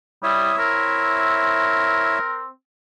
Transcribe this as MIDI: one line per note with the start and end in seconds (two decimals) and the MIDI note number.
0.23 0.51 55
0.23 2.18 64
0.23 2.18 73
0.23 2.18 76
0.23 0.56 87
0.59 2.50 60
0.59 2.43 70